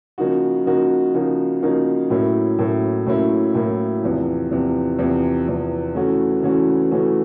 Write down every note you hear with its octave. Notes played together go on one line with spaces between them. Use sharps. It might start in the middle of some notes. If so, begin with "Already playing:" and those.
C#3 F3 A#3 D#4 F#4
C#3 F3 A#3 D#4 F#4
C#3 F3 A#3 D#4 F#4
C#3 F3 A#3 D#4 F#4
A2 F#3 A#3 C#4 E4
A2 F#3 A#3 C#4 E4
A2 F#3 A#3 C#4 E4
A2 F#3 A#3 C#4 E4
E2 C3 F3
E2 C3 F3
E2 C3 F3
E2 C3 F3
C#3 E3 A3 C#4 F#4
C#3 E3 A3 C#4 F#4
C#3 E3 A3 C#4 F#4